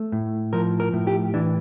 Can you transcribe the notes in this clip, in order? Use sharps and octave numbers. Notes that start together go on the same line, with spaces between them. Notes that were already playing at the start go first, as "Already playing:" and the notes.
Already playing: A3
A2
F3 A#4
A#4
A2
G4
E3 D4